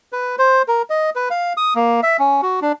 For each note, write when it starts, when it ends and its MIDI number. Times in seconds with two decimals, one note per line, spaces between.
0.13 0.36 71
0.39 0.62 72
0.68 0.82 70
0.90 1.10 75
1.16 1.29 71
1.31 1.53 77
1.57 1.74 87
1.75 2.01 58
2.03 2.17 76
2.19 2.41 61
2.43 2.60 66
2.62 2.72 62